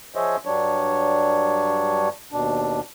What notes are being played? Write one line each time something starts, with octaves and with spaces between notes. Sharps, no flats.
F3 G#4 C5 C#5 D#5 E5
G2 F#3 G3 D4 C#5
D#2 B2 D4